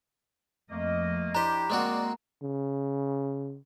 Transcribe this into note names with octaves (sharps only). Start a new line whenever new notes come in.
F2 A3 A#3 D#5
D4 E4 G4 C5 A#5
G#3 A#3 C4 F#4 D5
C#3